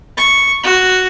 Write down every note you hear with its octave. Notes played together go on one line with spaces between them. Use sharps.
C#6
F#4